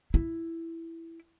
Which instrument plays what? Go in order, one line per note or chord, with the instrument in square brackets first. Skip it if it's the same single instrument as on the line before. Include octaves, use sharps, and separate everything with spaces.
[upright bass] E4